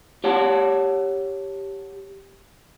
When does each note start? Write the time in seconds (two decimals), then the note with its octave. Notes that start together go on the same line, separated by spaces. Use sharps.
0.24 G4 C#5 F#5 A5